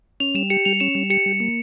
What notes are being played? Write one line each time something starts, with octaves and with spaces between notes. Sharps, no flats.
C#4 F7
G3 E7
G4 C#7
G3 F7
C#4 E7
G3
G4 C#7
G3
A#3